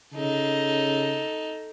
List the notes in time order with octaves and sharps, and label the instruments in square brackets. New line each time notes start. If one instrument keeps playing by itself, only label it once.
[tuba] C#3 [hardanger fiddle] D#4 A4